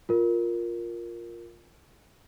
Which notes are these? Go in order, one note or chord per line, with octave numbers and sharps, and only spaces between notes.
F4 A#4